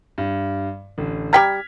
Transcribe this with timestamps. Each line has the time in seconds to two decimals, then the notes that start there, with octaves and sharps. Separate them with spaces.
0.18 G2
0.98 A1 D3
1.33 G3 G5 A#5 F6 G#6 B6